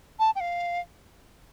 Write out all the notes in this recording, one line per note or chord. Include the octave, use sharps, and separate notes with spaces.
A5
G5
F5